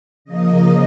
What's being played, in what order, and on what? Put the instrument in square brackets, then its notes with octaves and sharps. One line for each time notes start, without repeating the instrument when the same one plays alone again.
[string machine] C#3 F3 A#3 D#5